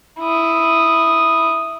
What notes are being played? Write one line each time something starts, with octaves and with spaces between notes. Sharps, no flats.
E4 D#6